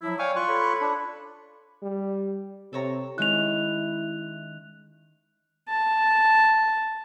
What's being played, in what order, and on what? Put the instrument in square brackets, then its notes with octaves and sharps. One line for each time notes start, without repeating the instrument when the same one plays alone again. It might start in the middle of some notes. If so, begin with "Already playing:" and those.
[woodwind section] F3 F#3 E4
[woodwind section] C#5 D5 G5 [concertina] F5 G#5 C#6
[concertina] F4 C#6 F#6
[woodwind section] A4 C#5 B5
[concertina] D4
[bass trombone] G3
[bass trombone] C3 [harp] A4 C#5 A#5
[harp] D#3 G#3 C#4 [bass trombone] E4 [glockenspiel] F#6 F7
[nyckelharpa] A5